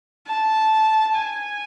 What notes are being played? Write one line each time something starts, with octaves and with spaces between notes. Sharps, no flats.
A5
G#5